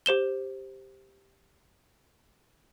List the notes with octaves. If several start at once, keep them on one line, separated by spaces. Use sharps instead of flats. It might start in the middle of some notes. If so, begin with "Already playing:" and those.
G4 C5 E7 G7